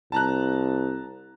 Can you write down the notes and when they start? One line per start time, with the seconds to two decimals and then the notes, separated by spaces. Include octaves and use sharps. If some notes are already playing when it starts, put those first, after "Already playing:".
0.12 C2 A5 A#5 F#6